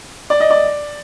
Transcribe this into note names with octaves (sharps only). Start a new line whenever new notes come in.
D5
D#5
D5